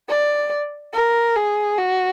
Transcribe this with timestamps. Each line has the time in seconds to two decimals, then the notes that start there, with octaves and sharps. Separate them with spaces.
0.09 D5
0.93 A#4
1.36 G#4
1.78 F#4